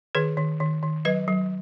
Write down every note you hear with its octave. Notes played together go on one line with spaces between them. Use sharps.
D#3 G#4 B4
D#3
D#3
D#3
F#3 B4 D#5
F#3